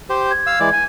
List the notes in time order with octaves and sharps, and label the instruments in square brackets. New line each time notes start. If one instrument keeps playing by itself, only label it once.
[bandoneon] G4 C5
[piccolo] G#6
[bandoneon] F5 E6
E3 G#3 D5
G#5